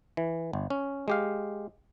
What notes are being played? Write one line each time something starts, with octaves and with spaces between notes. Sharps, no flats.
E3
G1
C#4
G#3 G4 F5